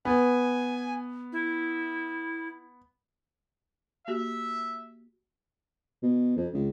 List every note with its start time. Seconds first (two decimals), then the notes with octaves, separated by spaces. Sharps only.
0.05 B3 G#5
1.33 E4
4.08 A#3 F#4 G4 E5
6.03 B2
6.37 F2
6.54 C#2